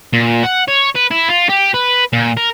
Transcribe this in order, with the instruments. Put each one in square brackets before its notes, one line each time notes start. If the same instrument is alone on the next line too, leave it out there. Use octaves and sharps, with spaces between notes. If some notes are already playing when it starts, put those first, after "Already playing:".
[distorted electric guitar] A#2
F#5
C#5
B4
E4
F4
G4
B4
A#2
A#4